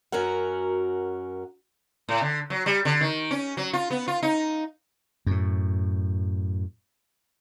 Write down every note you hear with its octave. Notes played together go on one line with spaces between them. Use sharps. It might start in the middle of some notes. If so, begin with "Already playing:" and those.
F#2 C#4 F#4 A#4 F#5
A2
D3
F#3
G3
D3
D#3
C#4
F#3
F4
B3
F4
D#4
F#2 A2